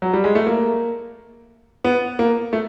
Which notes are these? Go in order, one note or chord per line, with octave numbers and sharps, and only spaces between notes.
F#3
G3
G#3
A3
A#3
B3
A#3
A3